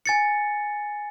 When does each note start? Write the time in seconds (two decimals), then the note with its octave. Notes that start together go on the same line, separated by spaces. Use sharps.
0.06 G#5 A6 C#7